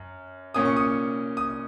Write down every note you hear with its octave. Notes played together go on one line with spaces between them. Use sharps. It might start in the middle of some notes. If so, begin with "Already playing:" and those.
Already playing: F#2
A#2 A#3 C#4 D#6
C#6
D#6
D#6